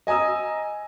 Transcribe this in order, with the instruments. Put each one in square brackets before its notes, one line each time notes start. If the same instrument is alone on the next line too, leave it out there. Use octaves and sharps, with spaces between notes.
[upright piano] D#5 G#5 A#5 D#6 E6